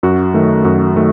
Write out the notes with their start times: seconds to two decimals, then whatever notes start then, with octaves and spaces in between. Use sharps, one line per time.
0.03 F#2 F#4
0.34 D#3 A3
0.64 F#2 F#4
0.96 D#3 A3